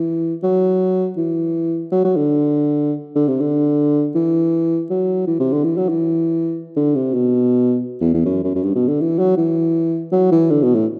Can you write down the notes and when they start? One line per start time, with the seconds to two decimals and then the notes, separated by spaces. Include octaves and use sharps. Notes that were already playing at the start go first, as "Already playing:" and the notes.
Already playing: E3
0.43 F#3
1.17 E3
1.92 F#3
2.05 F#3
2.16 D3
3.16 D3
3.28 C3
3.41 D3
4.15 E3
4.90 F#3
5.27 E3
5.40 C3
5.52 D3
5.64 E3
5.77 F#3
5.89 E3
6.77 D3
6.95 C3
7.14 B2
8.01 E2
8.14 E2
8.25 F#2
8.44 F#2
8.55 F#2
8.63 G2
8.75 B2
8.88 D3
9.01 E3
9.19 F#3
9.37 E3
10.12 F#3
10.32 E3
10.50 D3
10.63 B2
10.75 A2